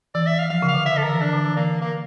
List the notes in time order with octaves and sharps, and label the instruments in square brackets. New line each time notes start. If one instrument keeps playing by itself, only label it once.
[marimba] E3 [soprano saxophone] D5
[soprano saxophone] E5
F5
[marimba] F3 [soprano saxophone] F5
[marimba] C#3
[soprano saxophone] F5
[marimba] D3
[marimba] C#3 [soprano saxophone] E5
[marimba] D3 [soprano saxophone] A4
[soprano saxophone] A#4
[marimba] E3
[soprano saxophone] D4
[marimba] D3
E3
[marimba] E3 [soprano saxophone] A#3
[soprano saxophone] A#3